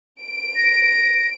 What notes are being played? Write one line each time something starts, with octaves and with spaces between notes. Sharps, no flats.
D7
A#6